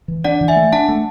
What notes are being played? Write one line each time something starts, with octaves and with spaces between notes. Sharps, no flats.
E3
D4 D5 F#5
E3
E5 G#5
A3
D4 F#5 A5
A3